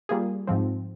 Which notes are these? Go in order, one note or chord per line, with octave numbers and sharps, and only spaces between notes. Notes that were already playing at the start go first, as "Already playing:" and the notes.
G3 A#3 F4 G#4
G#2 F3 C4